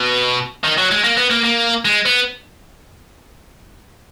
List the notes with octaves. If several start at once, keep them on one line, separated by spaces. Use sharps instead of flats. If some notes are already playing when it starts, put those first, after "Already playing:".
Already playing: B2
D#3
F#3
G#3
A#3
B3
A#3
A#3
G#3
B3